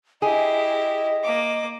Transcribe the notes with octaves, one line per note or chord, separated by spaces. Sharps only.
E4 G4 G#4 D#5
A#3 D6